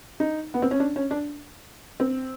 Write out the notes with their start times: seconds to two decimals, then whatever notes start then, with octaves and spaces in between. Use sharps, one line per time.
0.20 D#4
0.54 B3
0.62 C4
0.71 C#4
0.80 D4
0.96 C#4
1.11 D4
2.00 C4